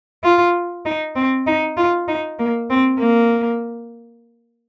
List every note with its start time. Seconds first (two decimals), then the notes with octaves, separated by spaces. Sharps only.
0.24 F4
0.85 D#4
1.16 C4
1.47 D#4
1.77 F4
2.08 D#4
2.39 A#3
2.70 C4
2.99 A#3